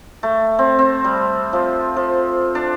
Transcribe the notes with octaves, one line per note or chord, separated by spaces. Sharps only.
A3
C4
C4
G3
F3
F3
D4